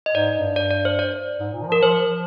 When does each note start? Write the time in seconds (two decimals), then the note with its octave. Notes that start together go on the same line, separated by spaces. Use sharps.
0.06 D#5
0.15 G#2 D5
0.35 G2
0.56 D5
0.70 D5
0.85 C5
0.99 D5
1.40 G#2
1.54 A#2
1.62 D#3
1.68 F3 A#4
1.82 F3 C5